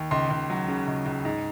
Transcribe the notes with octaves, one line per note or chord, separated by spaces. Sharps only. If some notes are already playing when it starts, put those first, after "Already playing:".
Already playing: D#2
C#2 C6
C#2
F#3
C#3
C#2
C#2
G#2